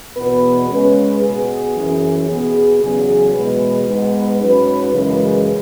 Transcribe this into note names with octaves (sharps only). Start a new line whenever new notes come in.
E2 B2 B3 B4
C#3 G#3 C#4 B4
B2 B3 G#4
F#2 E3 C#4
B2 B3 G#4
E2 C#3 F#3 G#4
E2 B2 G#3 B4
G#2 G#3 B3
G#2 F#3 C#4 B4
F#2 C#3 E3 G#3 B4